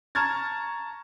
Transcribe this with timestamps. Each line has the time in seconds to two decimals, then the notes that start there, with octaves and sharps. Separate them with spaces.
0.15 A5 A#5 C#6 F6 G#6 A6